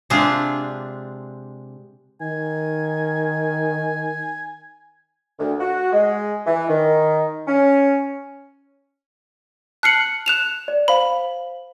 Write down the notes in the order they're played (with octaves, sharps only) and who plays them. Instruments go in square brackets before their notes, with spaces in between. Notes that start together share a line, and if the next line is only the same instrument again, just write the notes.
[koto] C3 G#3 C4 D4 F4
[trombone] D#3 [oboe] G#5
[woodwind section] D2
F#4
G#3
E3
D#3
C#4
[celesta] A5 F6 F#7 [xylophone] F#6 C7 C#7
[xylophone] F#6 E7 F7
[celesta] D5
[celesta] C5 F5 [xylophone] B5